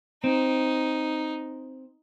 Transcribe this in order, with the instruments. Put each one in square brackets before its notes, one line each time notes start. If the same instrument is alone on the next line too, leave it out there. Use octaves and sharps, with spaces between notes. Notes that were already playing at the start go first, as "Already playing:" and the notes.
[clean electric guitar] C4 [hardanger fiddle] D#4